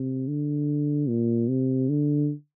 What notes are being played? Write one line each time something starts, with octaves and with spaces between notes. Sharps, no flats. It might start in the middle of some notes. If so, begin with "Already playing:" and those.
Already playing: C3
D3
A#2
C3
D3